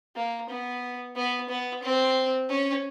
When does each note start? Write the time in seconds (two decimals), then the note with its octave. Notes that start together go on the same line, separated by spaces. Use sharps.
0.16 A#3
0.49 B3
1.16 B3
1.49 B3
1.83 C4
2.49 C#4